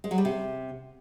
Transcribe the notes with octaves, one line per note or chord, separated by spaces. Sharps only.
G#3
F#3
G3
C3